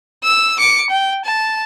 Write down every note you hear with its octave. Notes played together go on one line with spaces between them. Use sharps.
E6
D6 C#7
G5
A5